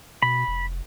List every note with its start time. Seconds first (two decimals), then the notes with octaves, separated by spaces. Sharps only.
0.23 B2 B5
0.48 F1